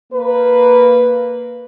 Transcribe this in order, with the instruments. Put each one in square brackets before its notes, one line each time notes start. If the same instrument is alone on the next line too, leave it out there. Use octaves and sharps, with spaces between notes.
[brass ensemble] A#3 B4